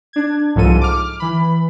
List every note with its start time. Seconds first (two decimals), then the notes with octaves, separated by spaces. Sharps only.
0.13 D4 G#6
0.55 C2 G#2 F3 A4 D#7
0.81 D6 F6
1.20 E3 B5